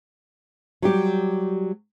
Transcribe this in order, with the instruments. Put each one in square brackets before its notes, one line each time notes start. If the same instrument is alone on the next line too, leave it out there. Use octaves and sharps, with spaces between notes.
[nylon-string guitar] F#3 G3 G4